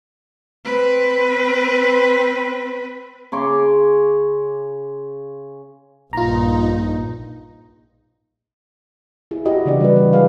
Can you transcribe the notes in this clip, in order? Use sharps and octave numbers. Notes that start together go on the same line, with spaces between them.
C4 B4
C#3 C#5 C6 D6
A#1 G2 D#4 F4 A#5
E4 G#4
E4 F#4 G4 D#5
C#3 E3 D4 D5
G3 F#4 B4
E3 B3
F3 F#3 D#4 G#4 B4 F5